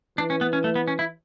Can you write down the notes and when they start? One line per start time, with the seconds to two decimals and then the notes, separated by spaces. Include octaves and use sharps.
0.18 E3 D4
0.30 C#4
0.41 B3
0.53 C#4
0.64 A3
0.75 B3
0.88 C#4
0.99 E4